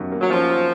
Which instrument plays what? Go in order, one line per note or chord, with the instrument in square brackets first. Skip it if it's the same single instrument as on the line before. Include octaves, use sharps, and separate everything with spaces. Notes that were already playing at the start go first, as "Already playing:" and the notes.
Already playing: [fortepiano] F#2 D#3 C#4
A#3
[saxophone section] F#3
[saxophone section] F3 [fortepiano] C#4
[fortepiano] D#3